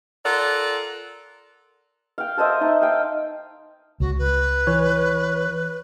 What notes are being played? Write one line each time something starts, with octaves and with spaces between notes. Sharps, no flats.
F4 A4 A#4 D5 F#5
F5 G5
A4 C5 D#5 E5
D#4 D#5 E5
F5 G5
C#2 F#4
B4
E3 C#5